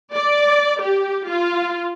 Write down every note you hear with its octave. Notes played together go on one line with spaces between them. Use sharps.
D5
G4
F4